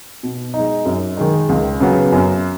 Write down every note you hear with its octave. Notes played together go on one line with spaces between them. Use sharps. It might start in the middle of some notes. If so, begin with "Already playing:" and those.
B2
D#4
G#3
F#2
D#3 G#3 D#4
C#2
C#3 F#3 B3
F#2